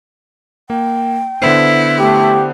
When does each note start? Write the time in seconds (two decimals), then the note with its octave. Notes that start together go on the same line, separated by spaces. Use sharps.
0.70 A#3 G5
1.42 D3 B3 E4 C5
1.99 A3 G4